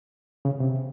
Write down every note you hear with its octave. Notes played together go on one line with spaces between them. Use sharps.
C#3
C3